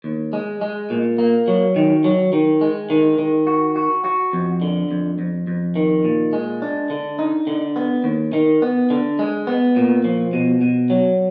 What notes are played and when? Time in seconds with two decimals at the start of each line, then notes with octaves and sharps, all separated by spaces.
0.04 D#2
0.33 G#3
0.61 G#3
0.90 A#2
1.18 A#3
1.48 F#3
1.76 D#3
2.04 F#3
2.33 D#3
2.61 G#3
2.90 D#3
3.18 D#3
3.47 F#4
3.76 F#4
4.05 F#4
4.33 F2
4.62 D3
4.91 F2
5.19 F2
5.47 F2
5.76 D#3
6.05 A#2
6.33 G#3
6.62 D4
6.90 D3
7.19 D#4
7.47 D3
7.76 B3
8.04 D#2
8.33 D#3
8.62 B3
8.90 D3
9.19 G#3
9.47 B3
9.76 A#2
10.04 F3
10.33 B2
10.61 B2
10.90 F#3